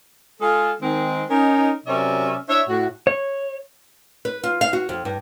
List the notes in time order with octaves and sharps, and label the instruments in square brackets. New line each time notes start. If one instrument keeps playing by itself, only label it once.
[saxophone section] G#3 F4 G#4 A4
D#3 G#3 C4
C#4 D#4 A#4
C3 F#3 C#4 A#4 D5 E5
D4 E4 C#5 E5
A2 F#4
[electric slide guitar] C#5
[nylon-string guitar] B4
F4
F5
F#4
F2
G2